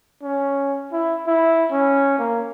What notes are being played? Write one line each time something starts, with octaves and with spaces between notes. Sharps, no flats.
C#4
E4
E4
C#4
A#3